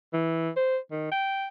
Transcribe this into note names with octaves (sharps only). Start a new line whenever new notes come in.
E3
C5
D#3
G5